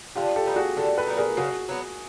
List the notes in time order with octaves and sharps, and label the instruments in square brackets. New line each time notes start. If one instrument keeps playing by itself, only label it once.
[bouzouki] D3 [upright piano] F4 G4
[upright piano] G4 A4
[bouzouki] G3 B3 D#4
[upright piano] F#4 G#4
[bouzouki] D3 [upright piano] G4 A4
[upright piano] A4 B4
[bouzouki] G3 B3 D#4
[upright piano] G#4 A#4
[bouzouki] C#3 [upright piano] F#4 G#4
[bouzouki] F#3 B3